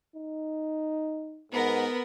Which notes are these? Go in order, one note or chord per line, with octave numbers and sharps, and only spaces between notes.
D#4
G#2 B3 A#4